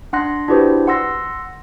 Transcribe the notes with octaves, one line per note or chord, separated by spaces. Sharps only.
D4 F#5 C6 F#6 A#6
D4 E4 F#4 G4 B4 C5
F#5 C6 E6 A#6